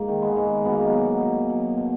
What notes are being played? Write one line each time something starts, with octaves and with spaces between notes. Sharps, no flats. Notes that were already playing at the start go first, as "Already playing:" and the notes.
Already playing: G#2 A#3
D#3
G#3 B3
G#2
B2 B3
A#3
G#3
F#3 A#3
B2
B2
F#3
B2